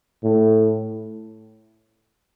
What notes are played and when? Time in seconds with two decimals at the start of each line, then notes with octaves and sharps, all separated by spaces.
0.23 A2